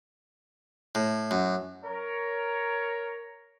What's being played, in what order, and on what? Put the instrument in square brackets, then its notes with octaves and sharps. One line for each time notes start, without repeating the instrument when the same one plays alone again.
[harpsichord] A2
F#2
[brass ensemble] A#4 C#5